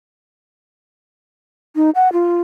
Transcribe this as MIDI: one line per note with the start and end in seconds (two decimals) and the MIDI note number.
1.76 1.90 63
1.95 2.11 78
2.13 2.42 65